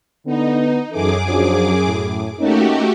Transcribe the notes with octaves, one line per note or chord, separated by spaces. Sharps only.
D3 B3 D#4
F#2 E3 C#4 G#4 A4 D6
F3 F#3 D4
A2
A3 A#3 C#4 D#4 F#4 G4